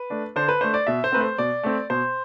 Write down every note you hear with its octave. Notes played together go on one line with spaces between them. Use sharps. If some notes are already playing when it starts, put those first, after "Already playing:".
Already playing: B4
A3 D4
D3 C5
B4
A3 D4 C5
D5
B2 E5
C5
A3 C4 B4
C5
B2 D5
A3 C4
B2 C5